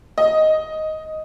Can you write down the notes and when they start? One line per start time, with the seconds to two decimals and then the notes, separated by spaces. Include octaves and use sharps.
0.18 D#5